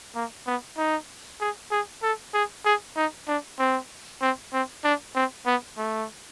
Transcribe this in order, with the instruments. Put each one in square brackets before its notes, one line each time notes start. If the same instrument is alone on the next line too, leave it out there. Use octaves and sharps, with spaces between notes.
[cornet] A#3
B3
D#4
G#4
G#4
A4
G#4
G#4
D#4
D4
C4
C4
C4
D4
C4
B3
A3